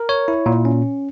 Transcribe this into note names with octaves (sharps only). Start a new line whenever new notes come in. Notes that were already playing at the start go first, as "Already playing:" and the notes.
Already playing: A#4
C#5
E4
A#2
C#4